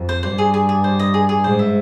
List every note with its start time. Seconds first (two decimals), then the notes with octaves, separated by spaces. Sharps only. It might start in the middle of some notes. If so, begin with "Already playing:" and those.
Already playing: F2
0.09 C5
0.23 G2 C5
0.38 G#4
0.54 G#4
0.69 G#4
0.84 C5
0.99 D#5
1.14 G#4
1.29 G#4
1.44 G#2 C5
1.59 E5